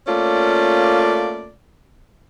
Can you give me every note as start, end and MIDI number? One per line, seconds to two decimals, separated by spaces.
0.07 1.51 57
0.07 1.51 58
0.07 1.51 61
0.07 1.51 65
0.07 1.51 74